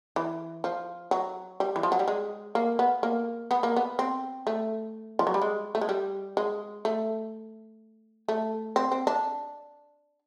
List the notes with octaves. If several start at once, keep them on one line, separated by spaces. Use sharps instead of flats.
E3
F3
F#3
G3
E3
F3
F#3
G3
G#3
A#3
B3
A#3
B3
A#3
B3
C4
A3
F3
F#3
G3
G#3
A3
G#3
G3
G#3
A3
A3
C4
C4
D4